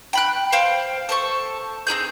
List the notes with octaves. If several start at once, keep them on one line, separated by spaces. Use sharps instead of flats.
G5 B5 F#6
C5 F5 G5
A4 C5 C#6
C4 E4 G#4 G6